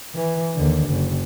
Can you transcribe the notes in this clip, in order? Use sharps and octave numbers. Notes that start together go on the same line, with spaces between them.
E3
D#2 D3
F#1